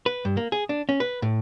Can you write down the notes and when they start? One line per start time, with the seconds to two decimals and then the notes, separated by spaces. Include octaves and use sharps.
0.06 B4
0.25 G2
0.37 A#3
0.52 G#4
0.69 D4
0.89 C#4
1.00 B4
1.22 A2